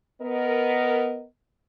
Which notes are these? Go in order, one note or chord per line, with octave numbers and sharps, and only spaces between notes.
B3 A#4 D#5